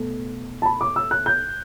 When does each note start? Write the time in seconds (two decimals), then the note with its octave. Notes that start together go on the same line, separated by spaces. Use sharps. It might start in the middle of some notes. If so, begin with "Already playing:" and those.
Already playing: B2 A3
0.62 A5
0.66 B5
0.81 D6
0.96 E6
1.11 F#6
1.26 G6